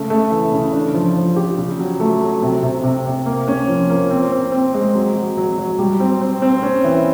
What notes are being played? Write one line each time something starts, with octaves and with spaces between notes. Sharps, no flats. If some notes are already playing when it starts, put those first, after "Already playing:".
Already playing: C#3 A3
A3
E3
C#3
D4
F3
F3
G4
C#3
F#3
A3
F#3
C3
C3
C3
C3
A#3
C#4
F3
A#3
C4
C4
C4
G#3
F#3
F#3
F#3
F#3
G3
C4
C4
C4
C#4
E3